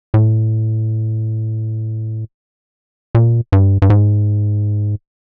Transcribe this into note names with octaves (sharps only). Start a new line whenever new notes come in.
A2
A#2
G2
G2
G#2